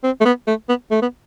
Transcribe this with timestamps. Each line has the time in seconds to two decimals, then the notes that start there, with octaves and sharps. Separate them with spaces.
0.04 C4
0.21 A3
0.25 B3
0.47 A3
0.69 B3
0.91 A3
1.02 B3